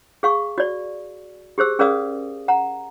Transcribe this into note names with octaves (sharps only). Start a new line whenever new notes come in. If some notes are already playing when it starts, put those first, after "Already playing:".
G#4 F5 C#6
F#4 D5
G4 G#4 C5 E6
C#4 G#4 A#4 D5 F5 D#6
F#5 A#5